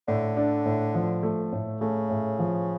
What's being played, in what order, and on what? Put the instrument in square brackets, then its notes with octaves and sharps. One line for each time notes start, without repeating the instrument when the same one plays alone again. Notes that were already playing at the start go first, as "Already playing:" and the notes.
[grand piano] A2 [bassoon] D3
[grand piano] D4
A2
F3
A3
A2
[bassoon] C#3 [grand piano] A3
[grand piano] A2
F3